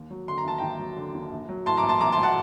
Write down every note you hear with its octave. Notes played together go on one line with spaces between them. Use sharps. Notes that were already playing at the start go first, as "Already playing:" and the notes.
Already playing: D#2
F#3
D3 C6
A#5
D#2 A5
D#2 G5 A#5
F#3
D3
D#2
A#1
F#3
A2 A5 C6
A#5 D6
A#1
A5 C6
A#1 A#5 D6
A5 C6
F#3
F#5 A5